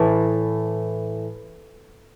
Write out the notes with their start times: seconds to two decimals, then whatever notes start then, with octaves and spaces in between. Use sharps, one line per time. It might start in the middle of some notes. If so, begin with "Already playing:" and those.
Already playing: A2 E3 A3